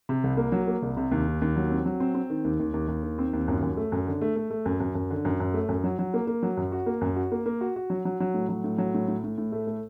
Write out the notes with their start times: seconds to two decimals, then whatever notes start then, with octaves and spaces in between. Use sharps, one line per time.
0.09 C3
0.24 C2
0.37 A#3
0.52 F#3
0.67 A#3
0.82 C2
0.97 C3
1.11 D#2
1.27 D#3
1.42 D#2
1.56 F#3
1.71 C4
1.86 F#3
2.00 C4
2.15 C4
2.30 D#3
2.44 D#2
2.59 D#2
2.74 D#2
2.88 D#2
3.03 D#3
3.19 C4
3.33 D#2
3.48 F#2
3.62 F#2
3.77 A3
3.92 F#2
4.07 D3
4.21 A3
4.36 A3
4.50 A3
4.66 F#2
4.80 F#2
4.95 F#2
5.11 D3
5.25 F#2
5.40 F#2
5.54 A3
5.69 F#2
5.84 F#3
5.99 F#3
6.14 A#3
6.27 A#3
6.43 F#3
6.57 F#2
6.72 F#4
6.86 A#3
7.01 F#2
7.16 F#4
7.32 A#3
7.46 A#3
7.61 F#4
7.76 F#4
7.90 F#3
8.05 F#3
8.20 F#3
8.34 A2
8.49 F#3
8.64 A2
8.78 F#3
8.94 A2
9.08 A2
9.24 A2
9.38 A2
9.52 A3
9.67 A3